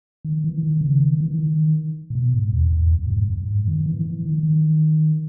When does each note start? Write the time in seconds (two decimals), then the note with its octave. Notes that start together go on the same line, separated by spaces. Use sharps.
0.25 D#3
0.44 E3
0.63 D#3
0.81 C#3
1.00 D#3
1.20 E3
1.39 D#3
2.10 A#2
2.15 B2
2.34 G#2
2.53 E2
2.73 E2
2.91 F#2
3.06 A#2
3.10 G#2
3.30 F#2
3.48 G#2
3.68 D#3
3.86 E3
4.05 E3
4.25 D#3
4.43 D#3